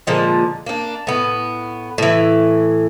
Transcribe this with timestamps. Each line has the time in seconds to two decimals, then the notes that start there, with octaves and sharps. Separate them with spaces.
0.07 A#2 D3 F3 G#3
0.66 A#3 D4
1.07 A2 B3
1.98 A2 E3